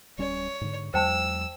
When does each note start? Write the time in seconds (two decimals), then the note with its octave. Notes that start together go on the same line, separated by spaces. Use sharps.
0.18 D1 G3 C#4 C#5
0.61 G#2 D3
0.94 E2 F#3 G#3 C5 G5 A5 E6